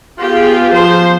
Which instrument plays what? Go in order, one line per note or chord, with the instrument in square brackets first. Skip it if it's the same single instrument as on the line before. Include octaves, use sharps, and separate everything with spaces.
[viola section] B3 G#4 [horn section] F4 [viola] G4
[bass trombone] F3 [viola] C5